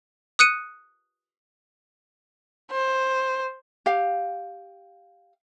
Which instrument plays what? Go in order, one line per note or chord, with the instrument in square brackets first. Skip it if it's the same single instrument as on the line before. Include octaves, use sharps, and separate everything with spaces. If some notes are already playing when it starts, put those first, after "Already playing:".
[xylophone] D#6 F#6 C#7 D#7
[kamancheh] C5
[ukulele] G4 F5